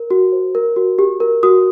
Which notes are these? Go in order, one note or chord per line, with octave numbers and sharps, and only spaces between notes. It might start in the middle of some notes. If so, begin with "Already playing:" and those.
Already playing: A#4
F#4
C5
A#4
F#4
G4
A#4
F#4 D#6